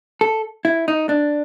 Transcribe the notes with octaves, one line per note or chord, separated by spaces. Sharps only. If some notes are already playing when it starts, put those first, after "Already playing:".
A4
E4
D#4
D4